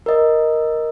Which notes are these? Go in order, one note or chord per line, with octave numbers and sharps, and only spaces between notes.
A#4 D#5